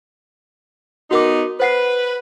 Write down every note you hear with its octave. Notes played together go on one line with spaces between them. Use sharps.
B3 D#4 F#4 A#4 D6
B4 C5 F#5 C7